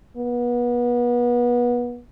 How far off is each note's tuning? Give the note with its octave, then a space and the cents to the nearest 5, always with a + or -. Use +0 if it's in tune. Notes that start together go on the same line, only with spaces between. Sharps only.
B3 -30